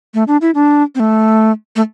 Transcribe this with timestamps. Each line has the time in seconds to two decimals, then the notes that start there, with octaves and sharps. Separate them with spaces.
0.14 A3
0.28 D4
0.41 E4
0.55 D4
0.95 C4
1.00 A3
1.76 A3